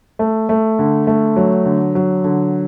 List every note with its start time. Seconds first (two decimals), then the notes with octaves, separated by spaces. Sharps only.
0.19 A3
0.49 A3
0.79 D3
1.07 A3
1.36 F#3
1.66 D3
1.95 F#3
2.24 D3